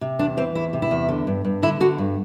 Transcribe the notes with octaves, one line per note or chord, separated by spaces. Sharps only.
C3
E2 D4
E3 C4
E2 E4
C3
E4
E2
D3
G2
G2
D3 E4
D3 F#4
G2